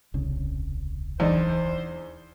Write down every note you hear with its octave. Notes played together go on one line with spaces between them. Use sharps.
D#1 C2 C#3
E2 D4 D#4 C5